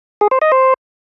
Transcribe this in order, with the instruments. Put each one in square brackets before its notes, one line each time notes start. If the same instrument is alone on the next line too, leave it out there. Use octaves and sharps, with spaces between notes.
[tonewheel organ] G#4
C5
D#5
C5